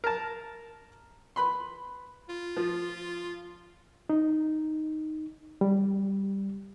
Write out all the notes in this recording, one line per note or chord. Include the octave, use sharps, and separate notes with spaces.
A#4 A5
B4 B5 C6
F4
F3
D#4
G3